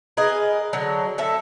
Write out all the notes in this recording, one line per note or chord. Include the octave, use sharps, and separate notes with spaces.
G#4 A#4 B4 D#5
D3 F#3
A2 A4 E5